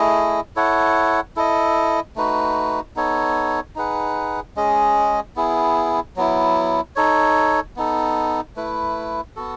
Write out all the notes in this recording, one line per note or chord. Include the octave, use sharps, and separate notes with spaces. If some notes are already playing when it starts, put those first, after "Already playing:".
Already playing: A3 E4 G#4 D#5
E4 A4 C#5 F#5
E4 A4 D#5
A3 D#4 F#4 B4
B3 D#4 A4 C#5
D#4 G#4 B4 F#5
G#3 C#4 G#4 D#5
B3 E4 G#4
F#3 B3 E4
D#4 A4 C#5
B3 D#4 A4
A3 E4 B4
B3 F#4 A4